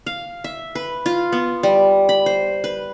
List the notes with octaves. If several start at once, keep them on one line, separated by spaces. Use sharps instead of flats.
F5
E5
B4
F4
B3
G3
B5
C5
B4